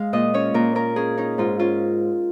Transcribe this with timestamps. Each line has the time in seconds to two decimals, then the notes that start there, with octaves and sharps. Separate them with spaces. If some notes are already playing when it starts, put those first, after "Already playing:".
Already playing: G#3 F5
0.13 A#2 D#5
0.34 C#4 C#5
0.54 A#2 A#4
0.75 C#4 A#4
0.96 C#4 G#4
1.18 C#4 D#4
1.38 G#2 F4
1.59 C#4 F4